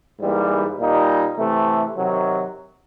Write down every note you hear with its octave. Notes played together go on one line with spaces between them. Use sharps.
G#2 E3 G3 A#3
A#2 G3 A#3 D#4
C3 E3 A3
C3 D#3 F#3